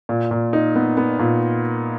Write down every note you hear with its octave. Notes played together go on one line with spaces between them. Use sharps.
A#2
A#2
D#4
B3
B3
A#2